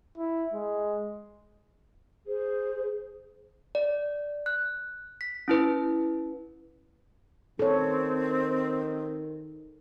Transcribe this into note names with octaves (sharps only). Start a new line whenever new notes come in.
E4
G#3
G#4 C5
D5
F#6
B6
C#4 E4 B4
D#3 C4 A4 C#5